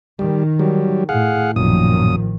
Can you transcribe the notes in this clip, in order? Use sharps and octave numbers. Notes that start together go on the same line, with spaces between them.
D#3 G3
F#3 G3
A2 G#4 F5 F#5
A1 F#2 A#2 D#3 F3 D#6